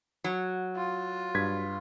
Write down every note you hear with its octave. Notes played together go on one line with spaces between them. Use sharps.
F#3
F4
G2 G#6 B6